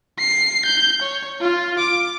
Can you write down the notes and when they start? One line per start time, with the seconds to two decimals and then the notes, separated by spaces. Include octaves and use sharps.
0.19 C7
0.65 G6
1.02 C#5
1.41 F4
1.79 D6